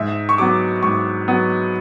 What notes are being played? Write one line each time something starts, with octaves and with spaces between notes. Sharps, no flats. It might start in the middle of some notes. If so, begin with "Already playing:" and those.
Already playing: G#2 E5
C#6
F#3 B3 D6
G#2 C#6
F#3 B3